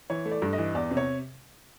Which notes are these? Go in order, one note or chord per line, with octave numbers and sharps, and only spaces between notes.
E3 C#5
A3
D5
G2
D#5
E3
E2 D5
C3
C#5